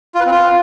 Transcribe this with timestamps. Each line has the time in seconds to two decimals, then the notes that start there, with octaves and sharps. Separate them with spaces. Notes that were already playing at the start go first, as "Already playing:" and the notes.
0.15 F4
0.20 B4
0.26 C4
0.31 F4